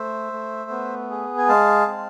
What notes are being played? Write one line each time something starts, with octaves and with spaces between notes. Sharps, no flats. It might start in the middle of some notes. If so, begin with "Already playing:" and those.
Already playing: A3 C5 E5
A3
B3
G#4
G#5
G#3 F5 A5
C4